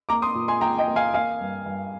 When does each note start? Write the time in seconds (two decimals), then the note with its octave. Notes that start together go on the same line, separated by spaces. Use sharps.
0.09 A#3 A#5 D6
0.22 C6 D#6
0.35 A#2
0.48 G#5 C6
0.61 A#2 G5 A#5
0.79 D#5 G5
0.88 A#3
0.96 F5 G#5
1.14 A#3 F5 G#5
1.41 G2
1.66 G2